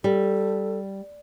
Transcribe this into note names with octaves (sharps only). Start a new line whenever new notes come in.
G3 A4